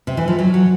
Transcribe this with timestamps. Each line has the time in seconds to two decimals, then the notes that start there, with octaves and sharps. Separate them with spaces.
0.07 C3
0.17 E3
0.28 F3
0.39 F#3
0.54 F#3